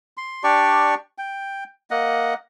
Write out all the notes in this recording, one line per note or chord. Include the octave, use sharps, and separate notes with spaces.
C6
D4 G4 D5 C#6
G5
A#3 D#5 F#5